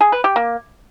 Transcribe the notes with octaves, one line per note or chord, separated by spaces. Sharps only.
G#4
B4
G4
A#3